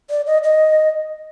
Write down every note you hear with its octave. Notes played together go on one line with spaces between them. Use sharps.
D5
D#5
D#5